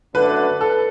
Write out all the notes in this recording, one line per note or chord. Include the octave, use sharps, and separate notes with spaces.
F#2 D3 A3 D4 B4
A4